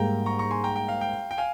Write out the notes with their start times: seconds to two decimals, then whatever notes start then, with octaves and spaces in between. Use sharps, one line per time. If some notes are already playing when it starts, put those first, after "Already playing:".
Already playing: G#2 G3 A#3 G5 A#5
0.26 A#5 C#6
0.39 A#5 C#6
0.51 G#5 C6
0.64 G5 A#5
0.76 G5
0.88 F5
1.01 G5
1.31 G5
1.38 F5 G#5